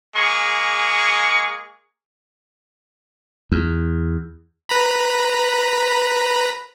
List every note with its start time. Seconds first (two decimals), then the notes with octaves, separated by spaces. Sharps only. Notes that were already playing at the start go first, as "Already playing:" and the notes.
0.15 G#3 A#3 G#4 C#6
3.52 E2
4.69 B4 A#5 B5